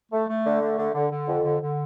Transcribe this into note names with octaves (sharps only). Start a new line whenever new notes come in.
A3
A3
D3
A3
D3
D3
D3
F2
D3
D3